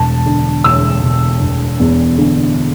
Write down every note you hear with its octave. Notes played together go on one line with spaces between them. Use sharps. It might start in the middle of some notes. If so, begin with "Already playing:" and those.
Already playing: E1 A5
D3
E1 E6
E1
E1
E2
D3